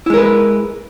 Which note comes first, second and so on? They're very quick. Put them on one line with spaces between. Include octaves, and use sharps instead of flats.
E4 G#3 A#4 B4